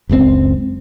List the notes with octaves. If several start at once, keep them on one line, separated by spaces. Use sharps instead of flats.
F#1 C#2 A2 C4